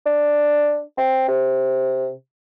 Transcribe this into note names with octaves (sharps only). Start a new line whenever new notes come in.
D4
C4
C3